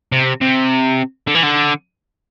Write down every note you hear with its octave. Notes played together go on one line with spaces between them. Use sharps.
C3
C3
D3
E3
D3